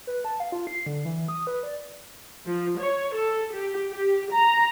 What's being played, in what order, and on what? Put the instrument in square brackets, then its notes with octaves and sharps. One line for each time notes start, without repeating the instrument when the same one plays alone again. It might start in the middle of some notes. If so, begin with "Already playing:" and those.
[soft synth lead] B4
A5
F5
F4
C7
D3
E3
D#6
B4
D5
[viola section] F3
C#5
A4
G4
G4
A#5